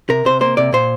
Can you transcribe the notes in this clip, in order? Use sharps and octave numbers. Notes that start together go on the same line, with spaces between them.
C3 A#4
C3 C5
A#3 C5
C3 D5
A#2 C5